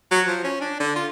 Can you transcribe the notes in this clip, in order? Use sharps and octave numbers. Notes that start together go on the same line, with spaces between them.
F#3
F3
C#4
D4
D3
F4